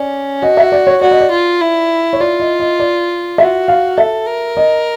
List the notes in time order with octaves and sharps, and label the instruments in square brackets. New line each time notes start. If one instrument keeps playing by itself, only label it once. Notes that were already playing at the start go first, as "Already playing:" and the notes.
Already playing: [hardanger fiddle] C#4 [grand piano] D5
[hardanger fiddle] F#4 [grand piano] D#5
[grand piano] E5
D5
C#5
[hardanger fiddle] F#4 [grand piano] D5
[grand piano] D#5
D5
[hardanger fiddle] F4
E4
[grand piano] C#5
[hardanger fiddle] F4 [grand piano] D5
[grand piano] D#5
D#5
D5
[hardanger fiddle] F#4 [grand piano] E5
[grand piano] F5
[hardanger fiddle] A4 [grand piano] E5
[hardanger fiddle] A#4
[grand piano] D#5